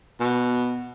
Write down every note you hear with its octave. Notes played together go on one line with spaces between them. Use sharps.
B2